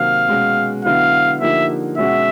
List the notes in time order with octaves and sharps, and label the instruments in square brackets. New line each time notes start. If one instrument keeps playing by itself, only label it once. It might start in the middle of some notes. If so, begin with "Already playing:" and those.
Already playing: [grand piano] C3 D#3 F#3 A#3 [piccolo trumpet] F5
[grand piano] B2 G#3 C#4
[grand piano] D3 F#3 B3 E4 [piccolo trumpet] F5
[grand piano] D3 F3 A#3 D#4 G4 [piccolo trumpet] E5
[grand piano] B2 G#3 C#4 F#4 [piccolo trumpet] E5